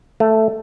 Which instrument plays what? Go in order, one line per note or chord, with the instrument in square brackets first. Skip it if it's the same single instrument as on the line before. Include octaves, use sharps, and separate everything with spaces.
[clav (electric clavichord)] A3